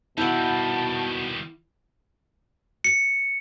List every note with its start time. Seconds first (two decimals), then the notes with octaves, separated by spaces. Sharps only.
0.18 B2 D#3 G3 E4 F#5 A5
2.84 C#7